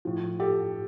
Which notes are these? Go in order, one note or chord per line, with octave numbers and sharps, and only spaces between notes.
A2 F3
G4 A4